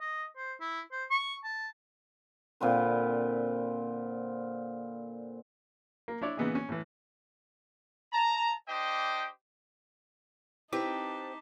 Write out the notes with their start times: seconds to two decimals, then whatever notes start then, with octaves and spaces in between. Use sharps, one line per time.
0.01 D#5
0.37 C5
0.61 E4
0.92 C5
1.11 C#6
1.44 A5
2.60 A#2 D3 C4 B4
6.08 A#3
6.22 D4 E4 C#5 D5
6.37 A#2 C#3 E3 B3 D#4 G#4
6.55 C#4
6.69 A2 E3
8.12 A5 A#5
8.68 D4 G4 C5 D#5 G5
10.73 C4 D#4 E4 G4 B4 A5 D6 B6